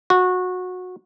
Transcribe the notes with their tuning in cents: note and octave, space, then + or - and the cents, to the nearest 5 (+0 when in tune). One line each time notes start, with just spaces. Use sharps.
F#4 -20